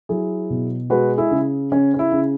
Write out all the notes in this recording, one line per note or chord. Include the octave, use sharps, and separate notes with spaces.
F#3 E4 G#4
B2
G#3 F#4 B4
E4 G#4
C#3
C#3 C#4
C#4
E4
C#3